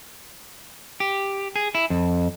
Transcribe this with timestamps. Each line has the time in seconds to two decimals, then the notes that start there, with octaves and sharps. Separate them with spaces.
1.00 G4
1.56 G#4
1.75 E4
1.90 F2